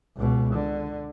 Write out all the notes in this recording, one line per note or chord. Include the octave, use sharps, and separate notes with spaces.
C#2 B2
D3